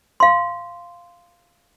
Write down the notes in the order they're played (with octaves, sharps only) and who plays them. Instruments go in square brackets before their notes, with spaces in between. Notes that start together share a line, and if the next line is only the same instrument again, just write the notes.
[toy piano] F5 C6